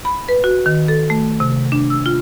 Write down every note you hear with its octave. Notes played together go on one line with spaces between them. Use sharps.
B5
B4
F#4
D#3
A4
A3
C3
D4
E6
F4